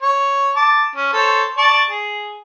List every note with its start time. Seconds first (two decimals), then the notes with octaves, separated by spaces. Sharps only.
0.02 C#5
0.56 A5 D6
0.95 C#4
1.13 A4 C5 C#5
1.58 D5 A5 C#6
1.90 G#4